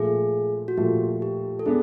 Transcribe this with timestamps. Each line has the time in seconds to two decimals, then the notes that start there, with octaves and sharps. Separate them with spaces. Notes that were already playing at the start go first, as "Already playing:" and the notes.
Already playing: A#2 F3 A3 G#4
0.68 F#4
0.77 A#2 F3 A3 G4
1.22 G4
1.59 A4
1.66 B3 D4 G#4